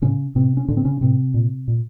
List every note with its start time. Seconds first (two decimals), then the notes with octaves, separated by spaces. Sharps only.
0.02 A2 C#3 C#4
0.35 A2 C3 C4
0.57 C#4
0.68 A2 D3 D4
0.77 C4
0.85 C#3 C#4
1.01 A2 C3 C4
1.34 A#2
1.68 A#2